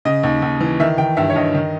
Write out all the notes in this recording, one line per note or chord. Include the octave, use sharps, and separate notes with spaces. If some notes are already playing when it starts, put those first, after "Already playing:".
C#3 D#5
D#2
D#2
E3
D#3 E5
D#3 G5
G2 E5
C#5
G2 D#5
D#3